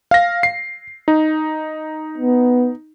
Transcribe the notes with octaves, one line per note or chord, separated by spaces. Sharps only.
F5 A#6
C7
D#4
B3